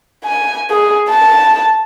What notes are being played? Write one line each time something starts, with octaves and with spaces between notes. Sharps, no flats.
G#5
G#4
A5